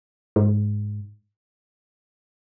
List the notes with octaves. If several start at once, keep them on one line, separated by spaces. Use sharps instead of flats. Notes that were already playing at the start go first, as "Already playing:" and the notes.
G#2